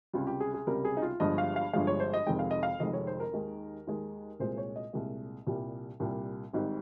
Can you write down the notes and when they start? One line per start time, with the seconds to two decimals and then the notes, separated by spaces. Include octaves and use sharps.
0.13 C#2 C3 G3 F4
0.27 G4
0.40 G#4
0.54 G#4
0.67 C#2 C3 G3 A#4
0.85 G#4
0.97 D#4
1.02 F4
1.20 G1 G2 F3 G#3 D#5
1.38 F5
1.56 F5
1.73 G1 G2 F3 G#3 F5
1.87 C#5
2.00 C5
2.14 D#5
2.26 F1 F2 D#3 G#3 G5
2.39 F5
2.51 D#5
2.63 F5
2.80 F1 F2 D#3 G#3 D#5
2.93 C#5
3.07 C5
3.20 A#4
3.33 D#2 D#3 G#3
3.87 D#2 D#3 G#3
4.40 C2 A#2 G#3 C5
4.57 C#5
4.76 D#5
4.93 C2 A#2 G#3
5.47 C2 A#2 G3
6.00 C2 A#2 G3
6.53 G#1 G#2 G3